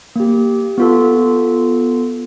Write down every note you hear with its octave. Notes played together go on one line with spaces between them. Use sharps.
A#3 G4
B3 F4 A4